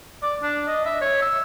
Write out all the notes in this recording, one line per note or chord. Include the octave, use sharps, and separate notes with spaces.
D5
D4
D#5
E5
C#5
E6